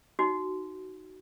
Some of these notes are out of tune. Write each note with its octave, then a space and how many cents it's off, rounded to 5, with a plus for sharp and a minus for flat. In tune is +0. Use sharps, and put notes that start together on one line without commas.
D#4 +0 F#4 +10